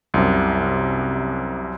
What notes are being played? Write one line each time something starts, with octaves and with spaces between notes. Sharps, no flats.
C2 F#2 C3